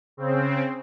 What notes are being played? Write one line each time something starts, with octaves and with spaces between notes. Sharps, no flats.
C#3 C4